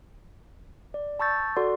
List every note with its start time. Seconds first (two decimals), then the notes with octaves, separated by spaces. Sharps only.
0.94 D5
1.19 A5 B5 C#6 E6 G6 A6
1.56 F#4 A4 D5 F#5 C6